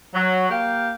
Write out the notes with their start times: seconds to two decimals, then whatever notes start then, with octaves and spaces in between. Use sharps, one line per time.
0.14 F#3
0.50 A#3 G4 F5 G5